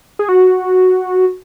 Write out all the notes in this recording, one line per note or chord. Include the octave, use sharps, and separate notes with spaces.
G#4
F#4